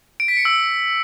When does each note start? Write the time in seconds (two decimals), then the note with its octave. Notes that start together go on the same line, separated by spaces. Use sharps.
0.20 D7
0.28 B6
0.37 C#7
0.45 E6